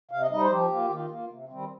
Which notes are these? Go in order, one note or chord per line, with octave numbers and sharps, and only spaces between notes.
C3 F5
D#5
G3 D#4 D#5
C5
F3 G4
A#3 F4
D#3 F4
A#3 F4
C3
D#3 G3 C4